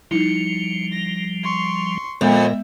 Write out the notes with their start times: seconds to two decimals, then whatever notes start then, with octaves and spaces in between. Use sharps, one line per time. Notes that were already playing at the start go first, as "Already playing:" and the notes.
0.11 F3 G3 D#4 E4 C#7
0.92 A#6
1.44 C6 C#6
2.21 F2 A#2 G#3 B3 A#4 E5